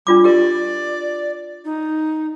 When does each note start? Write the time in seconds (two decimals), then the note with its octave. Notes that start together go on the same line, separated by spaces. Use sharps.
0.07 G3 D4 F4 D6
0.24 G4 A#4 D5
1.65 D#4